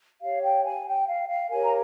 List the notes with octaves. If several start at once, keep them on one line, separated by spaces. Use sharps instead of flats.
G4 C#5 F5
G5
G#5
G5
F5
F5
G4 A#4 C#5 G#5
A#5